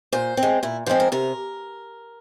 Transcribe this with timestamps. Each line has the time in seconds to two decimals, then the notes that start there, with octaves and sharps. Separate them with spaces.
0.12 A#2 C5
0.37 C4
0.43 G#3
0.63 A#2 E4
0.86 F3 G#3 C4 C5
1.00 A#4
1.12 C3 A#4